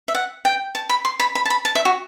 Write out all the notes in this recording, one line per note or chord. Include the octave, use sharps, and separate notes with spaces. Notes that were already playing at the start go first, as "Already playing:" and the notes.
E5
F#5
G5
A5
B5
C6
B5
B5
A5
B5
A5
E5
F#4